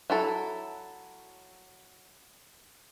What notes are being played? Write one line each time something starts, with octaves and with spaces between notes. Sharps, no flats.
F#3 E4 A4